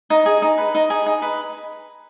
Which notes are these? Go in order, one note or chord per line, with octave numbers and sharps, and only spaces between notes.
D#4
G#4
D#4
B4
D#4
G#4
D#4
B4